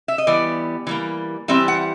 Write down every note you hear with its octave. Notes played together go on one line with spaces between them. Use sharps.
E5
D#5
E3 G3 B3 D5
E3 G3 A#3
E3 G3 C4 E5
F#5